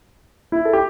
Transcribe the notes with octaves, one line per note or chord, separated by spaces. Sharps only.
E4
A4
G4